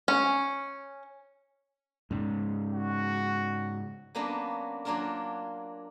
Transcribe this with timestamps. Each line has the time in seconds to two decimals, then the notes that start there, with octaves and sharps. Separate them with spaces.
0.08 C#4
2.11 G#2 C#3
2.74 F#4
4.15 F#3 A#3 B3 C#4 D4
4.85 F#3 A#3 D4 F4 A#4